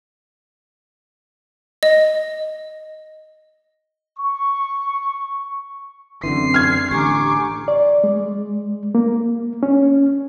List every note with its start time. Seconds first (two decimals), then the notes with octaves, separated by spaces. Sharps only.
1.83 D#5
4.18 C#6
6.24 F#2 D3 E3 C4 C7
6.54 F6 G#6
6.91 A1 D3 G4 G#5 A#5 C#6 D6
7.68 D5
8.04 G#3
8.95 A#3
9.63 C#4